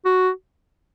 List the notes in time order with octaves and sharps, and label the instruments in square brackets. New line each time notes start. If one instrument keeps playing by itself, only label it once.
[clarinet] F#4